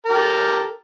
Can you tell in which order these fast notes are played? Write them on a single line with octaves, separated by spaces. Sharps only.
A#4 G4 A4